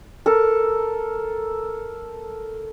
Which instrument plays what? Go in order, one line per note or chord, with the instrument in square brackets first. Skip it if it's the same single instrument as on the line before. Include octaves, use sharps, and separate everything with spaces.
[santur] A4 A#4